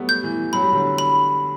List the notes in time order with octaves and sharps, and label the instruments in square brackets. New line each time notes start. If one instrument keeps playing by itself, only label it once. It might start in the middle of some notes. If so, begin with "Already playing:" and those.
Already playing: [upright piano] F#3 G3 A3 B3
[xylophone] G6
[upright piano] E3 G3
[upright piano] F#3 [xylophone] B5
[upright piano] G3
D3 F#3
[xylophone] B5